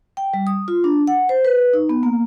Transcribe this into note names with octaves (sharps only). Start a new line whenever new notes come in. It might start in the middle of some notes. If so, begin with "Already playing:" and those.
G5
G3
D#6
F4
D4
F#5
C5
B4
D#4
B3
A#3